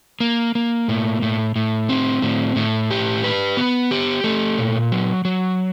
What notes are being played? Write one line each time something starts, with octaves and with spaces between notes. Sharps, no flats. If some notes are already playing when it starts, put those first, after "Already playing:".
A#3
A#3
A2
A2
A2
C4
A2
A2
G4
B4
B3
G4
A3
A#2
F#3
F#3